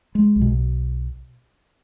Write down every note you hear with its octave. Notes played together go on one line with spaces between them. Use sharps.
G#3
B1
B2